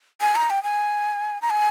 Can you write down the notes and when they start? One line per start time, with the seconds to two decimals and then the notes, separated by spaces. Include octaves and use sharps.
0.21 G#5
0.36 A#5
0.50 G5
0.63 G#5
1.42 A#5
1.50 G#5